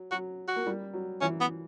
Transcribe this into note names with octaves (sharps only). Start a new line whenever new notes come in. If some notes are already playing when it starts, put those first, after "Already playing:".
Already playing: F#3
F#3 F#4
F#4
A#3
G3
F#3
E3 C#4
B3